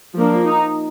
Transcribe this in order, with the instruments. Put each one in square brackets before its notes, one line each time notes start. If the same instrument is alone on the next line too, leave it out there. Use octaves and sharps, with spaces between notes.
[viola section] F3 A#3 D4
D#4